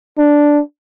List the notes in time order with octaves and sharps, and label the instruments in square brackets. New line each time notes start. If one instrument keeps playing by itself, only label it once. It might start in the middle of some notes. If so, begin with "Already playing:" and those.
[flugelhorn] D4